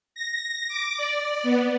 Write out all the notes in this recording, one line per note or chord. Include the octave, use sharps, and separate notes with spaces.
A#6
D6
D5
B3